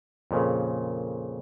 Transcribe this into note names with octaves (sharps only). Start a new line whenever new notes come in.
F2 A#2 C#3